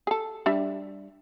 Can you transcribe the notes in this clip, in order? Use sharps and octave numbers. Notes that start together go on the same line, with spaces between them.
G#4 A4
G3 D4 E5